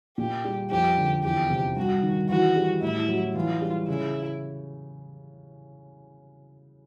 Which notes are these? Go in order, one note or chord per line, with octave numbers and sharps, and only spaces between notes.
A#2 G4
G3
F2 G4
D3
E2 G4
C3
G2 F#4
D#3
E3 F#4
G3
A2 E4
F#3
E3 F4
G3
C#3 E4